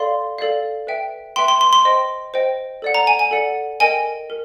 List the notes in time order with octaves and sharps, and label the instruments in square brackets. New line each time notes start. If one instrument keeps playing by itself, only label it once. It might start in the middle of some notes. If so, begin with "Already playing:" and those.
Already playing: [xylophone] A4 D5 F5 C6
A4 D5 F5
B4 E5 G5
B4 E5 G5 C6
C6
C6
C6
C5 D#5 G5
C5 D#5 G5
A4 D5 F#5
A#5
G#5
G#5
A4 D5 F#5
A#4 D#5 G5 G#5
A#4